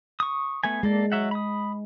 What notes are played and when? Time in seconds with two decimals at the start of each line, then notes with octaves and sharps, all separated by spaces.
0.20 C#6 D#6
0.64 A3 B3 G#5
0.83 G#3 A#3 A4 D5
1.12 F#3 E5 F#5
1.31 B5 D#6